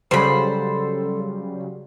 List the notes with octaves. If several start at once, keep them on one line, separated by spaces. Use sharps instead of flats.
C#3 F#3 G3 A4 C5 B5